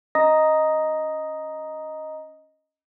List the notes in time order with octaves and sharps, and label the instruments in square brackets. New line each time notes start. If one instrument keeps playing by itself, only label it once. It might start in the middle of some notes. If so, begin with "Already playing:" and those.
[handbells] C#4 D#5 A#5 D#6 A#6